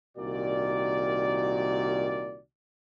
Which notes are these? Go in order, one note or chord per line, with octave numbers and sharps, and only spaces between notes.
C2 A#2 D#3 F#4 D5